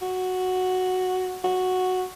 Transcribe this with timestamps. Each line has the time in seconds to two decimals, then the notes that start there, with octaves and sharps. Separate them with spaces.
0.02 F#4
1.44 F#4